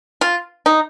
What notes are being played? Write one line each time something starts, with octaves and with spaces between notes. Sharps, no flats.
F4
D#4